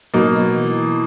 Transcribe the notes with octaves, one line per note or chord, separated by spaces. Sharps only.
B2 F#3 A#3 D#4
E3